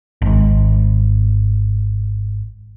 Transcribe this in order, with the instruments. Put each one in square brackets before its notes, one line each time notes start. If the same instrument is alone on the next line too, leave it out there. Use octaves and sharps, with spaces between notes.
[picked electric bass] G#1 G#2